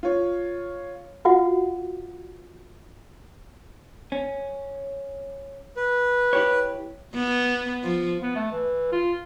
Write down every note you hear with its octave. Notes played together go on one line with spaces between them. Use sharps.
F4 C#5
F4 F#4 F5 F#5
C#4
B4
E4 G4 C#5
B3
F3
B3
A3
E3
F4